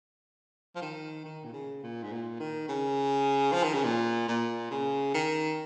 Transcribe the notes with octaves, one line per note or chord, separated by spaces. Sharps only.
F3
D#3
D#3
A#2
C#3
A#2
G#2
A#2
D#3
C#3
F3
D#3
C#3
A#2
A#2
C#3
D#3